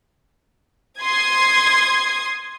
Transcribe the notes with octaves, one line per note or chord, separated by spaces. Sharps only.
C6 D#6 G#6